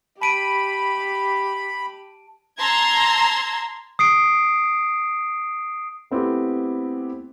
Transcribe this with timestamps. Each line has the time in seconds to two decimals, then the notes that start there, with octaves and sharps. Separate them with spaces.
0.22 G4 A5 B5 D7 D#7
2.58 A5 A#5 C6 E6 G#6
3.99 D#6 C7 D7
6.11 A3 B3 C4 E4 G4 A4